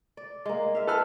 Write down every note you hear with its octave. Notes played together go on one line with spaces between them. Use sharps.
D5
G#3 A#3
E5 F5
A4 B4 F6